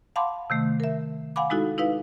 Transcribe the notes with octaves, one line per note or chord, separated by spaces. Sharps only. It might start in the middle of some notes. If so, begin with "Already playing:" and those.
F5 F#5 A5 B5 C6 D6
C3 D#3 A3
A#4 E5
F5 F#5 G#5 B5 D6
G#3 D#4 E4 F#4 A4
D#4 E4 B4 F5